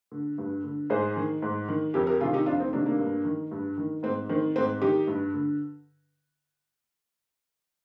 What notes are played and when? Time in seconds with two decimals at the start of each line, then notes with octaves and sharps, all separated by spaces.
0.12 D3
0.38 G2
0.64 D3
0.90 G#2 G#4 C5
1.16 D#3
1.42 G#2
1.68 D#3
1.94 F2 G4 A#4
2.07 G4 A#4
2.20 C3 D#3 F4 G#4
2.33 D#4 G4
2.46 F2 D4 F4
2.60 C4 D#4
2.73 C3 D#3 A#3 D4
2.85 A#3 D4
2.99 G2
3.25 D#3
3.51 G2
3.78 D#3
4.03 G#2 C4
4.29 D#3 C4
4.56 G#2 C4
4.82 D#3 D#4 G4
5.07 G2
5.34 D3